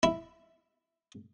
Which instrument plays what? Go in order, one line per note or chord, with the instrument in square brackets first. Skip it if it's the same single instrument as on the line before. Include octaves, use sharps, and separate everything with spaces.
[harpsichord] E4